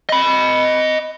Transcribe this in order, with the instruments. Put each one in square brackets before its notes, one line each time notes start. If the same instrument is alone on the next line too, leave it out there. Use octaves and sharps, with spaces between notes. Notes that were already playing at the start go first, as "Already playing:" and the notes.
[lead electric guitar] D#5 B5